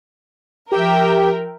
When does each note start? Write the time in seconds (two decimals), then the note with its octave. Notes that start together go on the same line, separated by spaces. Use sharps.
0.72 F3 G4 A#4 E5 G5